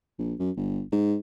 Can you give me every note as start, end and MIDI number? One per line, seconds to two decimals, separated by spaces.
0.18 0.34 34
0.39 0.51 42
0.57 0.81 31
0.92 1.15 44